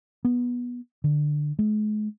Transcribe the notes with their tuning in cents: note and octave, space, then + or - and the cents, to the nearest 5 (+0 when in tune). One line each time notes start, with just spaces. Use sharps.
B3 -15
D3 +15
G#3 +40